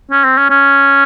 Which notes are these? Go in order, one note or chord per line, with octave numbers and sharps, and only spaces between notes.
C#4
C4
C#4
C#4